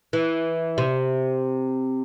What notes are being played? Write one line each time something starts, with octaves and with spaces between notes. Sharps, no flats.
E3
C3